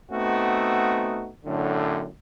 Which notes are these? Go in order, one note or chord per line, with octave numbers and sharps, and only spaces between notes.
A3 B3 C4 D#4 F#4
F#2 A2 D3